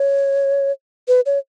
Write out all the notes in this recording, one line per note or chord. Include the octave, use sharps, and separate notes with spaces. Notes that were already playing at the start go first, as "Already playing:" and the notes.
Already playing: C#5
B4
C#5